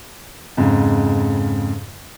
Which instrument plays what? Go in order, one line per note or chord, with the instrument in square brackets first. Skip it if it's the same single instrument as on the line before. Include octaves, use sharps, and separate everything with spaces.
[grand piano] F2 G#2 C#3